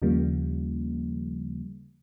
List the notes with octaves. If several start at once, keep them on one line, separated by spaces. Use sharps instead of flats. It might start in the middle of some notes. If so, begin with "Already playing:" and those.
D#2 C#3 F3 G3 A#3